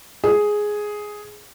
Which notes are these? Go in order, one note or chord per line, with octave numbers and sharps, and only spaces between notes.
G#4